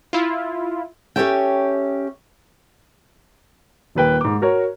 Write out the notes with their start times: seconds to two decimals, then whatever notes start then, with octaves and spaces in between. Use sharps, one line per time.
0.13 E4 F4
1.16 C#4 G4 A4 C#5 E5 G5
3.95 D#1 D#2 B4 G5
4.21 G#2 D6
4.42 F#4 A#4 C#5